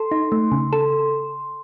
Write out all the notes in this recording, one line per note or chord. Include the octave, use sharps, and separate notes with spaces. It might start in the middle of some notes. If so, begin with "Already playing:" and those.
Already playing: A4 C6
D#4
A3
C#3
A4